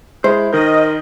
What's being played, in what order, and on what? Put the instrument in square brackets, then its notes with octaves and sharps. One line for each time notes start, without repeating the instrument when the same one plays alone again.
[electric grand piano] G#3 [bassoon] E4 [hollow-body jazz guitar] C5
[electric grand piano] D#3 G6 [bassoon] A#4 [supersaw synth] D#5